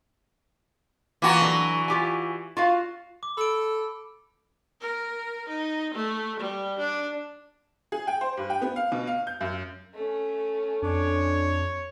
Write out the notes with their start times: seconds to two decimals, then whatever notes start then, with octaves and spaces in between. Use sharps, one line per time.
1.22 E3 A#3 F4 F#4 A#5
1.41 D3 F#3
1.88 F4 G4 G#5
2.57 F4 F#4 F5
3.23 D6
3.37 A4 B5 D7
4.81 A#4
5.48 D#4
5.94 A3
6.39 G3
6.78 D4
7.92 G#4
8.07 G5
8.21 C5
8.37 G2
8.50 G5
8.62 B3
8.76 F5
8.92 B2
9.07 F5
9.27 G6
9.41 F#2
9.94 A3 C#4
10.82 F2 D4 C#5